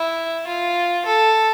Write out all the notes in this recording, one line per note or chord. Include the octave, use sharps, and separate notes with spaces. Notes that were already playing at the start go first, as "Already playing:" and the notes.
Already playing: E4
F4
A4